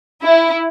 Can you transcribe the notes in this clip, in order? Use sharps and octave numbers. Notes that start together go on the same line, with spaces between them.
E4